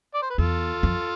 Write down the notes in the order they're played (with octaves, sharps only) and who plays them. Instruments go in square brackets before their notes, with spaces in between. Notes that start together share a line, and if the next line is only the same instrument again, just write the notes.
[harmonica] D5
C5
B4
[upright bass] E2 [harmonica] F4 A4
[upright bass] F2